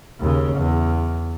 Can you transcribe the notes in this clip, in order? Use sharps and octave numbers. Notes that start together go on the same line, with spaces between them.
D#2 C#3
E2